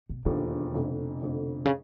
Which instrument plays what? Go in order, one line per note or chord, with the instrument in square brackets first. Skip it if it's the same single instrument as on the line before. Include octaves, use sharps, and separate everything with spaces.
[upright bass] B2
[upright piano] E1 D#2 D3 F3 [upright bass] B2
[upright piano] F1 F2 D3
F1 F2 D3
[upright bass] C#3